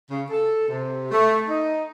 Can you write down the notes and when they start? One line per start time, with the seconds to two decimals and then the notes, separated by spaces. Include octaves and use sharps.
0.10 C#3
0.30 A4
0.69 C3
1.11 A3
1.48 D#4